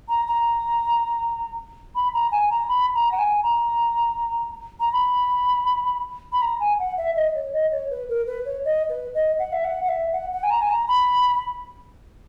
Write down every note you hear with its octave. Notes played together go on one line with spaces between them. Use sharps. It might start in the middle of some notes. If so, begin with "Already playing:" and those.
A#5
A#5
B5
A#5
G#5
A#5
B5
A#5
F#5
G#5
A#5
A#5
B5
B5
A#5
G#5
F#5
E5
D#5
C#5
D#5
C#5
B4
A#4
B4
C#5
D#5
B4
D#5
F#5
E5
F#5
F#5
E5
F#5
F#5
G#5
A#5
G#5
A#5
B5